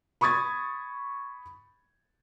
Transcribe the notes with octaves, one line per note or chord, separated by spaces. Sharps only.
B5 C#6 D#6 G#6 A6